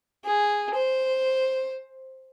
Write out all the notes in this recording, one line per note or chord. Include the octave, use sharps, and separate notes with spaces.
G#4
C5